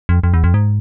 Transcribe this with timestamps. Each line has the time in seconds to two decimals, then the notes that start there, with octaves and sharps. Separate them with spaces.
0.09 F2
0.24 F2
0.34 E2
0.44 F2
0.54 G#2